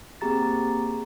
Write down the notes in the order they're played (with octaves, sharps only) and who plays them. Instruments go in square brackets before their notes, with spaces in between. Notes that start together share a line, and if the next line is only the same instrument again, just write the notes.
[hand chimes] A#3 C4 G4 G#4 A#5 A6